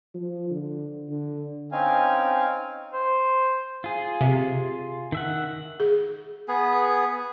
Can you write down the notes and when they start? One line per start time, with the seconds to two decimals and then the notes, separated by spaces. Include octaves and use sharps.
0.15 F3
0.50 D3
1.10 D3
1.72 C4 C#4 D#4 F5 G#5
2.93 C5
3.84 F4 G#4
4.21 C3
5.12 D#3 E5 F#5
5.80 G#4
6.48 B3 G#4